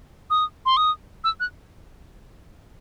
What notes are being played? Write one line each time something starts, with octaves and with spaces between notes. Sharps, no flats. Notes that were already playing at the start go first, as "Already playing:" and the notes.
D#6
C6
D#6
E6
F#6